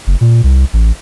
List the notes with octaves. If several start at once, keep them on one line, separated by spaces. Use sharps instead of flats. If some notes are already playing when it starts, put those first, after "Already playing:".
F#1
A#2
C2
A1